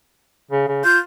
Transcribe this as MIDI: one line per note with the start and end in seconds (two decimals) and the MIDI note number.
0.51 0.63 49
0.68 0.80 49
0.84 1.00 65
0.84 0.98 91